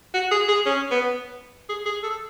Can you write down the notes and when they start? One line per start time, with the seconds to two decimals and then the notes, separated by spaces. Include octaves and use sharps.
0.14 F#4
0.31 G#4
0.49 G#4
0.66 C#4
0.91 B3
1.69 G#4
1.86 G#4
2.03 A4